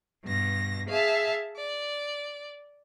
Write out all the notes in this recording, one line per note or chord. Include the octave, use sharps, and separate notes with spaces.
G2 B2 A#6
G#4 E5 F5 A5
D5